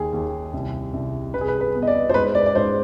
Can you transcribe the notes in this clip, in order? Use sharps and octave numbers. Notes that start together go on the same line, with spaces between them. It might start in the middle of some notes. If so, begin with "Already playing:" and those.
Already playing: D#2 G#4
D#2
C2
C2
C2 B4
G#4
B4
B4
B3
D#5
D5
C5
G#2 B4
D5
D5
G#2 C5